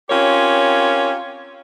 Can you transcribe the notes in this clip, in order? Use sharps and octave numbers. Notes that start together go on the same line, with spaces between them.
C4 C#4 F4 G4 A#4 C#5